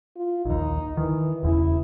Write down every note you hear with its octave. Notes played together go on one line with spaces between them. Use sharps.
F4
A#1 D#2 D#4
D#3 E3
E1 E2 C#3 E4